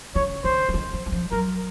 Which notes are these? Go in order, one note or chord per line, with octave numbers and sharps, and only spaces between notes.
C#3 C#5
D3 C5
E3
D#3
E3
F#3
F3
F#3 A#4